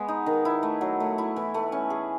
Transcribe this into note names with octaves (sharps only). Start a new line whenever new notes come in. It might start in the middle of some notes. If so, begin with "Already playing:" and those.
Already playing: G#3 B3
D#4
D#3
E4
A3
F#3
A3
E4
E3
A3
C#4
G#4